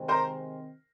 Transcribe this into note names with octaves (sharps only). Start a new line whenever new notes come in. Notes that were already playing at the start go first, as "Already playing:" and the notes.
Already playing: C3 D#3 G#3 C4
A#4 C5